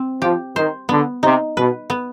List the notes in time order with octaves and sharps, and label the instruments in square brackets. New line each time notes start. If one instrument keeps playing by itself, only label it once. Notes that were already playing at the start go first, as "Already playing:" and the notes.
Already playing: [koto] C4
[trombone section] F3 [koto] G4
[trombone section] D#3 [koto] C5
[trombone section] D3 [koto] B3
[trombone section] C3 [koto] D#4
[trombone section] B2 [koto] B4
[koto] B3